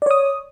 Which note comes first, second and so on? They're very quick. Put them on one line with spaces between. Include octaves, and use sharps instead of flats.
D5 C#5 D#6